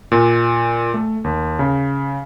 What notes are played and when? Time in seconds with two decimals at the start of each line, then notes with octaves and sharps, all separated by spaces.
0.12 A#2
0.94 A3
1.24 D#2
1.59 C#3